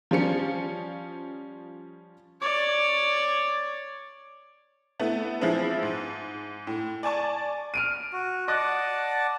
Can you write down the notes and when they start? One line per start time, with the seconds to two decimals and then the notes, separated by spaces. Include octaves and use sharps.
0.11 F3 G3 C#4 C#7
2.41 C#5 D5
5.00 A3 B3 E4
5.41 E3 F3 G#3 C4 E4
5.83 G#2
6.67 A2
7.03 D5 G#5 A5 C#6
7.74 F6 D7 D#7
8.13 F#4
8.48 D5 D#5 F#5 A5 D6 F#6